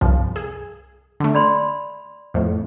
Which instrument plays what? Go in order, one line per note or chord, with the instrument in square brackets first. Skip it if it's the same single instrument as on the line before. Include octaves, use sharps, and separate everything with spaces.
[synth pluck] C2 G2 F3
G#4
D3 A3
[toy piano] D5 B5 C6
[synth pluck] F2 A2